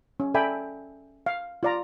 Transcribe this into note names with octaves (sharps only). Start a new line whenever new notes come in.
C#4
A4 D5 E5 G5 G#5 B5
F5
F4 D5 A#5